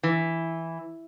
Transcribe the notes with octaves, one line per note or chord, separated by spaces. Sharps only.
E3